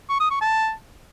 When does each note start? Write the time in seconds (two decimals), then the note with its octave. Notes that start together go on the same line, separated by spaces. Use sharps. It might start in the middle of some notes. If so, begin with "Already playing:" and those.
0.09 C#6
0.20 D#6
0.30 C#6
0.41 A5